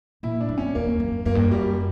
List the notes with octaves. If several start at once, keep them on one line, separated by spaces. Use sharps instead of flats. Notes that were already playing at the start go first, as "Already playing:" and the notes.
A#2 E4
D4
F#2
C#4
E2 A#3
F#2
F#2 A#3
G2
F#2
G3